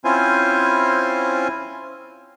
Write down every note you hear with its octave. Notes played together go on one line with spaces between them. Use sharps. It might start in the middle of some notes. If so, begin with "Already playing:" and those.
C4 C#4 E4 F4 C5 G#5